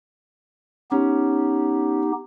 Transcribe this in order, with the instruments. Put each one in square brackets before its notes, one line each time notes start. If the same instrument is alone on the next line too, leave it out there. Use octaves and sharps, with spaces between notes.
[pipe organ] B3 D#4 G4 [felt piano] C#4